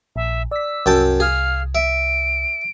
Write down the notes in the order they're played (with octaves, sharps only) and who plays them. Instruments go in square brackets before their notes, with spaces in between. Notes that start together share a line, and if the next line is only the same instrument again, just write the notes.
[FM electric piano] A#1 [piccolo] E5
[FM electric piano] D5 B6 [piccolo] E6
[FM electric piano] C2 [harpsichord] F#2 G5 A5
[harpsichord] G#4 [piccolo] F5
[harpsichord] E5 [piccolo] D7